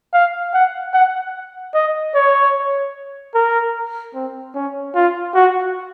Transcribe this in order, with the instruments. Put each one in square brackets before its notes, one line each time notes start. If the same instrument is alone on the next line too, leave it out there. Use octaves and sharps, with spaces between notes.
[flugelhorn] F5
F#5
F#5
D#5
C#5
A#4
C4
C#4
F4
F#4